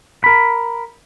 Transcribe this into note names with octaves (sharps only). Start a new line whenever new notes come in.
A#4 B5